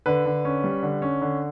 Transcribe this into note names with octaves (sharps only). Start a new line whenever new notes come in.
D3 B4
D3
C#4
G3
D3
C#4
D3